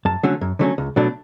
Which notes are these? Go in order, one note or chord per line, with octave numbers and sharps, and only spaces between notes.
F#2 A5
D3 F#3 A3 C#4
F#2
D3 F#3 A3 C#4
C#2
B2 F#3 A3 D4